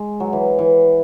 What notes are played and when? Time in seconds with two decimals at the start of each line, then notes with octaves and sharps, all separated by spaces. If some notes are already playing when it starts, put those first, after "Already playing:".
Already playing: G#3
0.20 F#3
0.33 E3
0.59 E3